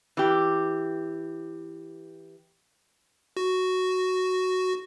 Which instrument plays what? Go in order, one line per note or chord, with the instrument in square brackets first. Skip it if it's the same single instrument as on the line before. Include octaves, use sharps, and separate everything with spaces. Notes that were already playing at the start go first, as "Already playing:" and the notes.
[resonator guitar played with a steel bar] E3 G4
[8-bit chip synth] F#4